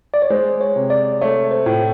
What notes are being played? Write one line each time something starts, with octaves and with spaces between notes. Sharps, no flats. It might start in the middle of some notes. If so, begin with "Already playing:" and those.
D5
C#5
G#3 C5
C#5
C3
D5
A3 C#5
C5
A2